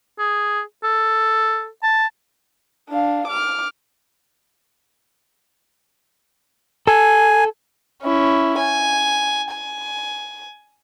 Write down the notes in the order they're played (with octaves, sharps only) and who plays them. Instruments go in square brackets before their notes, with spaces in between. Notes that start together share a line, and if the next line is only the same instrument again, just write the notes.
[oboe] G#4
A4
A5
[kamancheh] D4 F5
D6 F6
[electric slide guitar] A4 [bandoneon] G#5
[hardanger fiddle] C#4 E4
G#5
G#5